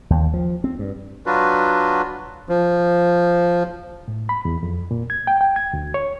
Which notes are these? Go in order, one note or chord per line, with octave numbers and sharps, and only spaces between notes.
D#2
F3
C4
G2
F#3 D4 F4 F#4 B4
F3
A2
B5
E2
F2
A#2
G#6
G5
G5
G#6
D2
C#5